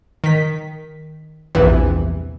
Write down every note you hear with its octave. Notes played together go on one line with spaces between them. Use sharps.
D#3 B6
A#1 E2 G2 C3 E3